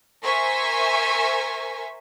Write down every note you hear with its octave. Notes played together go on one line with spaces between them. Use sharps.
A#4 C5 E5 G#5 C#6